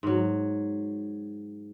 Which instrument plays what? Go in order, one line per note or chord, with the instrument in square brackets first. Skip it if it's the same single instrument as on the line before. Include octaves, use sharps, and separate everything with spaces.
[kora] G#2 F#3